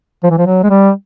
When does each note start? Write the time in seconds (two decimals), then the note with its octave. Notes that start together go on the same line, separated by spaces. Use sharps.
0.23 F3
0.30 E3
0.37 F3
0.46 F#3
0.63 G#3
0.70 G3